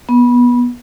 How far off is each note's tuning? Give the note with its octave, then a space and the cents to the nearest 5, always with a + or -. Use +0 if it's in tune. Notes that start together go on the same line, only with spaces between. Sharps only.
B3 -20